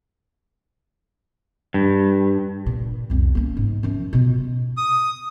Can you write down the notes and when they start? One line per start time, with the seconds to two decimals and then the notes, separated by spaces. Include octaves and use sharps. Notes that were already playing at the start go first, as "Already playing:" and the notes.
1.74 G2
2.66 A#2
3.10 C2 F2
3.35 A#3 C#4
3.57 G#2
3.83 F#2 F3
4.13 B2 F4
4.77 D#6